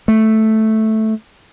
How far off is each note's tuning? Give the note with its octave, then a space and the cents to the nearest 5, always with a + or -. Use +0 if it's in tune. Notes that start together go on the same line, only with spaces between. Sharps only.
A3 -5